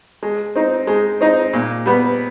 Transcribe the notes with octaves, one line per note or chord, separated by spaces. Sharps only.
G#3
C4 D#4
G#3
C4 D#4
A#2
G3 B3